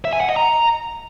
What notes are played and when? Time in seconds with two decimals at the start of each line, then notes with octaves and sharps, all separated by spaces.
0.05 E5
0.13 G#5
0.21 F#5
0.28 D#5
0.36 A#5